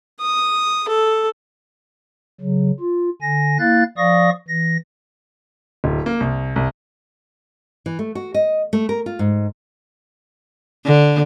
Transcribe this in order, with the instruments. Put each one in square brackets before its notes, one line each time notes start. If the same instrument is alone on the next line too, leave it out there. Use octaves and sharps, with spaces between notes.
[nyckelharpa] D#6
A4
[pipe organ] C#3 F#3
F4
D3 G#5 A#6
A#3 E4 F5 F#6 A6
F3 D5 F5 C#6 D#6 A#6
E3 A#6
[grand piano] D1
A#3
C2
C2
[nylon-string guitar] E3
A3
F#4
D#5
A3
A#4
F4
G#2
[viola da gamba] D3